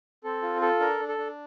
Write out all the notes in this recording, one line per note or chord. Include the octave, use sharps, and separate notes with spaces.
C4 A4
F4
A4
D4 A#4
D4
A4
D4